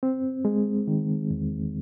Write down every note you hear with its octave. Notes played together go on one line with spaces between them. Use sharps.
C4
G#3
D#3
E2